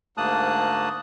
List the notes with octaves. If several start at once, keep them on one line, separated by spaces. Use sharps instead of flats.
D2 G#2 A#3 A5 D#6 F#6